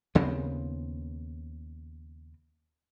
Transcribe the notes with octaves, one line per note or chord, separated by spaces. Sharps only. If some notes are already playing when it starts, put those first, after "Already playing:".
D#2 C#3 B3 C4